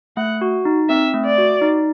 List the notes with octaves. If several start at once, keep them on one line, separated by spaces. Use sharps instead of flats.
A3 F#5
F#4
D#4
C4 E5
A3
D5
F#4
D#4